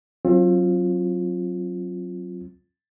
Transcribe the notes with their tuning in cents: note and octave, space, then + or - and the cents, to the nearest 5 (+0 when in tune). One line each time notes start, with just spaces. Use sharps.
F#3 -10 C4 +35 F4 +0